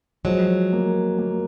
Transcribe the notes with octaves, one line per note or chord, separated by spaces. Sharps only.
F3 F#3 G#3
A#3
A#3